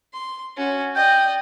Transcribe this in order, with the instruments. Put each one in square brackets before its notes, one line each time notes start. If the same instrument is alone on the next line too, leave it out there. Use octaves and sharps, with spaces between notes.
[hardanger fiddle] C6
C#4 F#4
[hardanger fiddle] D5 D#5 [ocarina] G5 [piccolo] G6